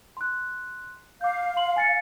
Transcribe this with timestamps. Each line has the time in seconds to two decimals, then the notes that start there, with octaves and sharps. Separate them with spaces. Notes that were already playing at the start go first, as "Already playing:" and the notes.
0.17 C6 F#6
1.21 F5 D6 G6
1.57 C6 F#7
1.76 G#5 A6 C#7